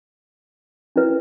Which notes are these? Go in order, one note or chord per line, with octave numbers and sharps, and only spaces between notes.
C#4 E4 B4